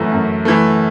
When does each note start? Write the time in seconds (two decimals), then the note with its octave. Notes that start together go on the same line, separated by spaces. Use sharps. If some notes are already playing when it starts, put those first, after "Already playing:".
Already playing: F#2 E3 A3
0.12 F#2
0.45 E3 A3